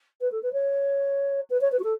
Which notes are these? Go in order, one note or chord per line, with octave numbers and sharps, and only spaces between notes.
B4
A4
B4
C#5
B4
C#5
B4
F#4
A4